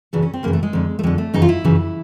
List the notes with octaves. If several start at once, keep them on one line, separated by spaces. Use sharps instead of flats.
F#2 C#3 E3 D4
C#4
C4
F#2 C#3 E3 A#3
A3
G#3
F2 D3
A3
F2 D3 G#3
A3
F#2 C#3 E3 D#4
F4
E4
F#2 C#3 E3